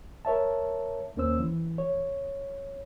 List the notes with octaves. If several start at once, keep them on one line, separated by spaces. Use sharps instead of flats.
A#4 C#5 E5 A5
D#2 A#3 C#4 C5 E6
E3
C#5